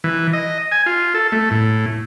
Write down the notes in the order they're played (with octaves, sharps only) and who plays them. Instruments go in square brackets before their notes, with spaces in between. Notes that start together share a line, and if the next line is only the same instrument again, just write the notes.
[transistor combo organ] E3
D#5
G#5
F4
A4
A3
A2